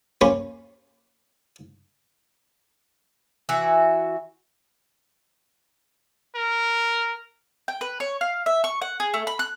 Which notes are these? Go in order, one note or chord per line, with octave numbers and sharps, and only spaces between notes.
A#3 C#4 G4 B5 C#6
E3 F#4 E5
A#4
G5
B4
C#5
F5
E5
C#6
F#5
G#4
A3
B5
F#6